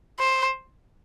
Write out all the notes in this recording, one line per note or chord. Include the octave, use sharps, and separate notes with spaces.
C5